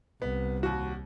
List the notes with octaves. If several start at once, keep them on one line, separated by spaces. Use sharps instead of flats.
C2 B3
D#2 F#4